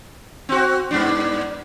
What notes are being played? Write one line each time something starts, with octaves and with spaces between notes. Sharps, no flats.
C4 F#4
G2 B3 D4